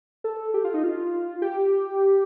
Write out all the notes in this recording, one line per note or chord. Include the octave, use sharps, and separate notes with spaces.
A4
G4
F4
D#4
F4
G4